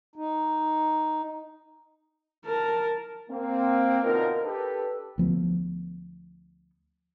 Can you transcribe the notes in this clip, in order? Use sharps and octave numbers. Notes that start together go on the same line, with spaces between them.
D#4
A#4 A5
A#3 C4
B2 D3 D#4 F4 A#4
D4 G4 A4 B4
D2 F3 B3